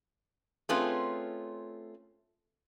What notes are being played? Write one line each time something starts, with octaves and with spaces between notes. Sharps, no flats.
A3 C4 C#4 F4 G#4 B4